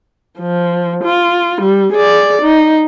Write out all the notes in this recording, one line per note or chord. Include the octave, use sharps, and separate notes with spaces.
F3
F4
G3
G#4 D5
D#4